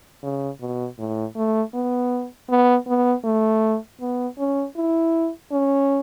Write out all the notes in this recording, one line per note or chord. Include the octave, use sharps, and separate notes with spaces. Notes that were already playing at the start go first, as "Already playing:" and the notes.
C#3
B2
A2
A3
B3
B3
B3
A3
B3
C#4
E4
C#4